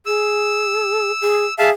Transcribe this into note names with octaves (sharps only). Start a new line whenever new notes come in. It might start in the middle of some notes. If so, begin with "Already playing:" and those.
G#4 E6
G#4
G#4 E5 F5 A5